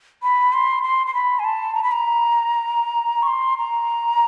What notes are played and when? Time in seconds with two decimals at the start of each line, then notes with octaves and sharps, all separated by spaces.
0.23 B5
0.53 C6
0.83 C6
1.07 C6
1.14 B5
1.39 G#5
1.44 A5
1.75 A#5
1.83 B5
1.92 A#5
3.22 C#6
3.27 C6
3.58 A#5